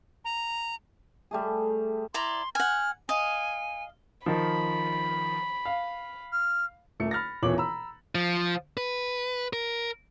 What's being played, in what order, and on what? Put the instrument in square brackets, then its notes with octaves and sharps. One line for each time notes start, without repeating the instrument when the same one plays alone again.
[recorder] A#5
[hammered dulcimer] G3 A3 G#4
[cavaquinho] E4 D5 A#5 [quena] C6
[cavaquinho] F#5 G#5 [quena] F6
[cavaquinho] D#5 F5 [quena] G#5
[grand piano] D#3 F3 [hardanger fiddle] B5
[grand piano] F5
[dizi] F6
[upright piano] D#1 A3 C#7
B5 F6 A6 A#6
D#1 B2 E3 C#5 D6 F#7
A#5 B5 E6
[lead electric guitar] F3
B4
A#4